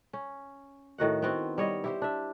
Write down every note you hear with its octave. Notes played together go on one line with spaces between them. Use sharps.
C#4
A2 D#3 F#4 F#5
B3 C4 F#4
G3 C#5 D#5
E4 G4 C5
D4 E5